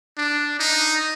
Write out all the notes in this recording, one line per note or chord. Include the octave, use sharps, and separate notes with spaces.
D4
D#4